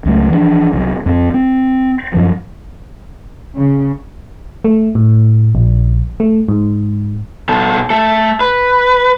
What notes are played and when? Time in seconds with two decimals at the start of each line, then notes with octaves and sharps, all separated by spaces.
0.05 C#2 F#3 A3
0.30 E3 F3 A#3 D4
0.73 C2 F#3
1.06 F2 A#3 C4
1.34 C4
2.14 F#2 F3 F#3
3.56 C#3
4.64 A3
4.95 A2
5.55 A#1
6.20 A3
6.49 G#2
7.49 B2 A4
7.90 A3 A4
8.41 B4